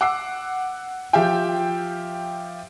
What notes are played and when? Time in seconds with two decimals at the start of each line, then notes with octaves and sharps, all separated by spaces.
0.01 F#5 D6 E6 C7
1.13 F3 G4 E5 F5 G5